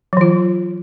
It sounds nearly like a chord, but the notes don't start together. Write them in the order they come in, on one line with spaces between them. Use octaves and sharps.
F#3 E3 F4